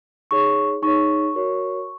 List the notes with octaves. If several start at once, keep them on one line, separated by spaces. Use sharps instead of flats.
D#4 G#4 C#5 C#6
D#4 G#4 C#5 C#6
F#4 A#4 C#5